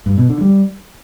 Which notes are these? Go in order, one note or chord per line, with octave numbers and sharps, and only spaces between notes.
G2
B2
D3
G3